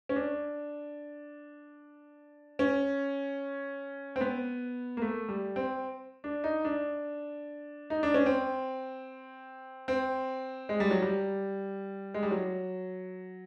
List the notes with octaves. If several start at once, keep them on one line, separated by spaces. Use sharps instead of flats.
C#4
D4
C#4
C4
B3
A#3
A3
G3
C4
D4
D#4
D4
D#4
D4
C#4
C4
C4
G#3
G3
F#3
G3
G#3
G3
F#3